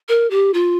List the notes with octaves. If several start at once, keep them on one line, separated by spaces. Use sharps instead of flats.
A#4
G4
F4